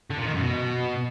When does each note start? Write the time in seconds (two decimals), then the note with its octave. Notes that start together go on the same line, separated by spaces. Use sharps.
0.11 D3
0.18 A#2
0.26 D#3
0.34 F#2
0.42 B2